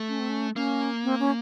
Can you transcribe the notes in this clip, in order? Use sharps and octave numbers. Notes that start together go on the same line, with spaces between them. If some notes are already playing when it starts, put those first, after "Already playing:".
Already playing: A3
C#4
C4
C#4
A#3 C#4
C4
C#4